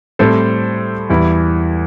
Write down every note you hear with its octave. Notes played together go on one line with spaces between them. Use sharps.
A2 G3 C4 A4 C5
E2 E3 G3 E4